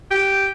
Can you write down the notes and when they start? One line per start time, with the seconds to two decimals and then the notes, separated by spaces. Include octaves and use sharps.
0.11 G4